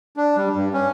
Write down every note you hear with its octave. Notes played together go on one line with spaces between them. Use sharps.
D4
G3
G2
C#4